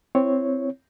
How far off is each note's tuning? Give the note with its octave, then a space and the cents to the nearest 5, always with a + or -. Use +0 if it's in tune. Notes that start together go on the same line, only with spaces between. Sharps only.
C4 +0 E4 +15 C#5 +0